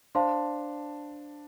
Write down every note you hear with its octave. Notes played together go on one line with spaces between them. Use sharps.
D4 C5 F5 A5 C6